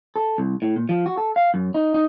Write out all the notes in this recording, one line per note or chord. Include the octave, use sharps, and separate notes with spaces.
A4
C2
A2
A#2
F3
F#4
A4
F5
F#2
D#4
D#4